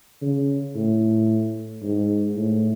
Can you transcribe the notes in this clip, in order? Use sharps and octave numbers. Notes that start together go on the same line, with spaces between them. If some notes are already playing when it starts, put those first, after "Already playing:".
C#3
A2
G#2
A2